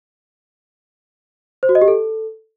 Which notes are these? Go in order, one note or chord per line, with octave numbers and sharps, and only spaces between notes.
C5
F#4
D#5
G4
A4